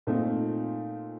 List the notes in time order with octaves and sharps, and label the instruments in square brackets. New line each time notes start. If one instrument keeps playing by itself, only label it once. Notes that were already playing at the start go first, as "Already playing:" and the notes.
[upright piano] A#2 A3 C4 D#4